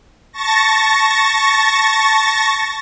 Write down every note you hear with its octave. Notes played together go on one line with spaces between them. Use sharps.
A5 C#6 A6 A#6